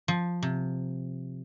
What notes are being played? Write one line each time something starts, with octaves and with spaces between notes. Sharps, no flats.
F3
C3